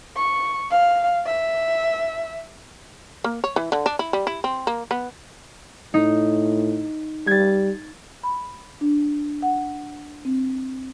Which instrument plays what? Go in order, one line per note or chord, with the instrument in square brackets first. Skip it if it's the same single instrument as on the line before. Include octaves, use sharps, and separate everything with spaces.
[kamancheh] C#6
F5
E5
[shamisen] A#3
C#5
E3
D3
D4
E4
G3
E4
C4
A#3
B3
[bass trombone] A2 [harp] D#4
[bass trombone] G3 [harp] G#6 A6
[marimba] B5
D4
F#5
C4